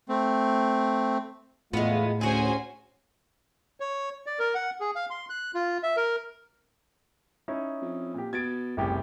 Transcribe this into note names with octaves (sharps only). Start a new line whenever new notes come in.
A3 C4
E2 A2 G#3 A3 B3 F4
D2 C#4 F#4 G#4 C5 G#5
C#5
D5
A#4
F#5
G#4
F5
C6
F#6
F4
E5
A#4
C#4 D#4 E4
F2
A#2 G4
B2 G#6 A6 D7
F#1 C2 A2 G4